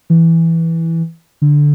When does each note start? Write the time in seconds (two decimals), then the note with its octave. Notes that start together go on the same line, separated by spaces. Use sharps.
0.10 E3
1.42 D3